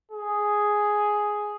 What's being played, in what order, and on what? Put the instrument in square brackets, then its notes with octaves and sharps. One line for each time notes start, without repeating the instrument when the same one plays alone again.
[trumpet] G#4